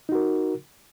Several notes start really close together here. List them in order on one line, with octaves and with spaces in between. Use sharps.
D#4 F#4 A#4